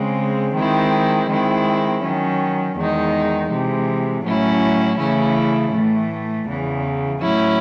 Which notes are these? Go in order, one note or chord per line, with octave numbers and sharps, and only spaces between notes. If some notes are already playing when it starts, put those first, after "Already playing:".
Already playing: C#3 G#3 C4
D#3 G#3 C4 E4
D#3 G#3 C4 E4
D#3 F#3 C#4
E2 D#3 G#3 D#4
C3 E3 G#3
A2 F#3 C#4 E4
C#3 E3 A3 C#4 E4
A2 E3 A3
E2 C#3 E3
A2 F#3 C#4 E4